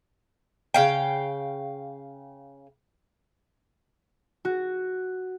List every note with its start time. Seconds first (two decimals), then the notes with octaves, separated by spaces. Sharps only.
0.74 C#3 F5 G5
4.45 F#4